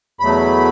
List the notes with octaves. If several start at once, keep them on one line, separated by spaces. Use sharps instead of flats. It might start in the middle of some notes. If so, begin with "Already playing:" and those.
E2 B2 F#3 A3 B5